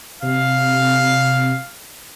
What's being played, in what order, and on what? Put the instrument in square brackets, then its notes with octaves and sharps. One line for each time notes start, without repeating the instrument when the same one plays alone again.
[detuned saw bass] C3 [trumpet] F5